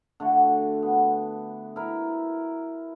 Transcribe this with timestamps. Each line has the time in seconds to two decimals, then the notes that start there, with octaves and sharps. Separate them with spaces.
0.20 D3 A3 F#4
0.83 B3
1.76 E4 A#4